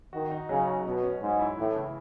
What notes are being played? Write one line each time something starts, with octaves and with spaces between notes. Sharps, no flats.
D#3 F#4
D#4
C#3 F#3
F#4
B2 C#4
C#4
G#2 C#4
E4
A2 E3
C#3